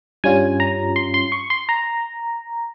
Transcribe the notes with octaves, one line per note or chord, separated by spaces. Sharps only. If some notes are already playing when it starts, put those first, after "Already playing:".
G2 G3 C#4 F4 G#5
A#5
C6
C6
C#6
C6
A#5